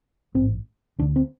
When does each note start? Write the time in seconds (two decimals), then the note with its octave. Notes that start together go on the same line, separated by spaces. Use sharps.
0.35 A1 G#2 C4
0.99 D2 D3 D4
1.16 C4